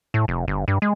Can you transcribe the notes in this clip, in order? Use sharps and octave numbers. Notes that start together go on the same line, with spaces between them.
A2
F1
G1
G2
G#3